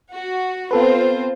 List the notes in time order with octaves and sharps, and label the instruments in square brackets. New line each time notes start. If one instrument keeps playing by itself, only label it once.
[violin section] F#4
[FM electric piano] B3 A4 B4 [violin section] C4 F4 C5